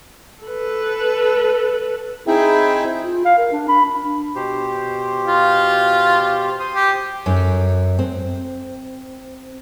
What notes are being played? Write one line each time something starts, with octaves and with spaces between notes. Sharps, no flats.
A4 B4
C4 D#4 E4 G#4 E5 G5
F4
F5
A#4
D4
B5
D4
B2 G4 C5
F4
C5 C6 D#6
G4
F#2
C4